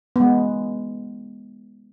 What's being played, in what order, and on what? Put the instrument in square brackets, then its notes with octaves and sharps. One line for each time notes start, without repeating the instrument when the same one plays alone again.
[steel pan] G#3 B3